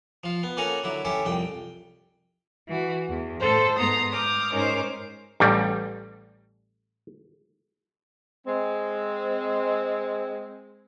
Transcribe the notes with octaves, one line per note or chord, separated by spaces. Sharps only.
F3 F4
B3
A#3 C#4 A4 F#5 G#5 A#5
D3 F#3 E4
C#4 E4 G4 A4
C2 F2 G5
E3 F#4
E2
A2 A4 C5
G#2 B3 A#5 C6 D#6
D6 D#6 F6 G6
G#2 C#4 D#4 A#4 C5 D6
A1 G3
G#3 C4